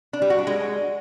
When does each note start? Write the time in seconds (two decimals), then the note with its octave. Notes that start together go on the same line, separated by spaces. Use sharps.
0.13 D4
0.22 G3
0.30 F#4
0.38 D4
0.47 G#3